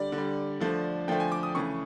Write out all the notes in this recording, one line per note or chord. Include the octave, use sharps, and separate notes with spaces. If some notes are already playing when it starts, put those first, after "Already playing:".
Already playing: D3 G3 D5
D3
G3
D3 F3 A3
D3 F3 A3 G5
G#5
D6
D#6
C#3 E3 A3 C#6